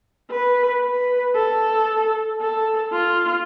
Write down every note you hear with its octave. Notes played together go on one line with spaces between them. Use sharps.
B4
B4
A4
A4
F4